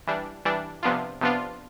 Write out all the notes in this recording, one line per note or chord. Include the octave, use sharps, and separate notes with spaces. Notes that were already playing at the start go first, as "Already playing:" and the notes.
E3 G3 D4
E3 G3 D4
C3 F3 B3 D4 F4
C3 F3 B3 D4 F4